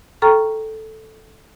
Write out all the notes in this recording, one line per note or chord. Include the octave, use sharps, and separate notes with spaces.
A4 G5 A#5 C#6 F6